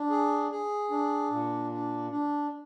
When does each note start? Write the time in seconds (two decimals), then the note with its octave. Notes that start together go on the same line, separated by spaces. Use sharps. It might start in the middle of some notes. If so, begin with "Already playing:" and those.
Already playing: D4
0.10 G#4
0.51 G#4
0.90 D4
1.30 A#2
1.71 D4
2.10 D4